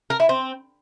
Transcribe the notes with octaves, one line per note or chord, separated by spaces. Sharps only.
A#4
E4
C4